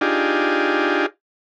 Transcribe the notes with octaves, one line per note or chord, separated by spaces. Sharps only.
D4 D#4 F4 G4 G#4